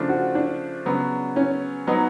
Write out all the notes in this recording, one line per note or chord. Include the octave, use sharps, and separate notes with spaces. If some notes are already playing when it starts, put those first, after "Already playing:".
Already playing: C#3 F3 A3 D4 F4
F#4
D4
C#3 F#3 B3
C#4
F#3 B3 D#4